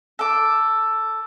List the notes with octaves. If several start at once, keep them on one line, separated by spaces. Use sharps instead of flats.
A4 D6